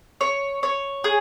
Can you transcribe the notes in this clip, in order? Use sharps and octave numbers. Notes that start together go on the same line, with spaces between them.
C#5
C#5
G#4